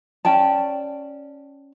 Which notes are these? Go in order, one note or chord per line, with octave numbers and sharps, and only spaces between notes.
C#4 D5 G5 A5